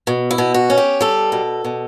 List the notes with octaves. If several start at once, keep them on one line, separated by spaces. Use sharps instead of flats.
B2
E4
B2
F#4
C#4
G4
G3 A4
B2
B2